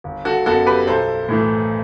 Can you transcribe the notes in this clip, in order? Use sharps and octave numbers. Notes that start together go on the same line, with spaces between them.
G1
F#4 A4
F#2 F#3 B3 F#4 A4
G4 B4
B1 A4 C5
A2 E3 A3